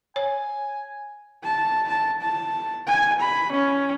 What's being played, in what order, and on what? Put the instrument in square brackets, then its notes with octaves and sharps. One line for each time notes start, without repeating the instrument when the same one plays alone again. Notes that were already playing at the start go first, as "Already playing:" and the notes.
[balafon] C#5 [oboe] G#5
[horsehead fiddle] A5
A5
A5
G#5
B5
C#4